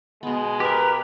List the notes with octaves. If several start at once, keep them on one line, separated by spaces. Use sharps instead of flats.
B2 G#3 B3
G4 A#4 B4